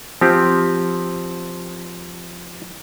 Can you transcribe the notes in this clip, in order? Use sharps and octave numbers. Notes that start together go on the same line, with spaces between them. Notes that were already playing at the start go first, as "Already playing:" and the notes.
F3 C4 G4